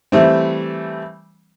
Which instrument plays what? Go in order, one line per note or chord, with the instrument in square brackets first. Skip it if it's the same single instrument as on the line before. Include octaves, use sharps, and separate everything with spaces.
[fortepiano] E3 G3 A3 C4